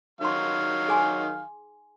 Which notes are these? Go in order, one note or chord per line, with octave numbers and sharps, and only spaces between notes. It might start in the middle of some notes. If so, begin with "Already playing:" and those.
D#3 F#3 D#4 F5 C6
G#4 G#5 C6